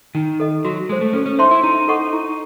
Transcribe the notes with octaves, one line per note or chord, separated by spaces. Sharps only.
D#3 D#4
A4 D#5
F#3 F#4
G#3 A4 C5
A3
C#4 A4
C#4
D#4 C5 E5 A5 C6
E4
D#4 E4
A4 D#5 F#5 C#6
E4